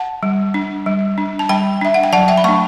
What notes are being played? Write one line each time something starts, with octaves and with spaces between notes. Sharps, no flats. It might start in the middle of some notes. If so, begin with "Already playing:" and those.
Already playing: F#5 A5
G3
D4
G3
D4
A5
G3 G5 B5
D4 E5
F#5
G5
F#3 F#5 A5
E5 G5
B5
A3 D4 A5 C#6